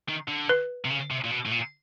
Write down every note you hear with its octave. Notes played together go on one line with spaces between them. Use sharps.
D#3
D3
B4
C3
C#3
C3
A#2
B2
A2
A#2